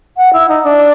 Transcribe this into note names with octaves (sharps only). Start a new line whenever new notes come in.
F#5
E4
D#4
D4